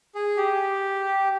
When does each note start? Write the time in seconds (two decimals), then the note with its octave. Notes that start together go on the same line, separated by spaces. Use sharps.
0.15 G#4
0.37 G4